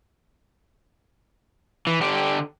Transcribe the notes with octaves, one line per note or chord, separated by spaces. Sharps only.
E3
D3 G4